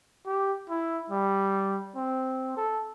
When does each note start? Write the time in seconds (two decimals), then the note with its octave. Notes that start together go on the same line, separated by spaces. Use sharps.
0.26 G4
0.69 E4
1.10 G3
1.95 C4
2.57 A4